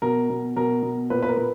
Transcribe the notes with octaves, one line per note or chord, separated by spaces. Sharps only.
B2 A#4
B2
B2 A#4
B2
A#2 B4
B4
A#4
A#2